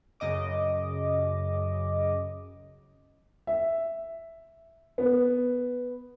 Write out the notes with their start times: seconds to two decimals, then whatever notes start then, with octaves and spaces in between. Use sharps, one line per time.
0.20 F#2 C#3 D#5 D6
3.47 E5
4.98 B3